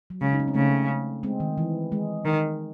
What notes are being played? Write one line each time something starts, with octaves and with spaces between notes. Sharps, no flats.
F#3
C#3 G#3
D#4
C#4
C4
C#3 A3
G#3 C4
D#3
E3
G#3
D#3